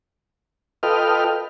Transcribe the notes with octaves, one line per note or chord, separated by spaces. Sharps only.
F4 A4 B4 D#5 G5 F6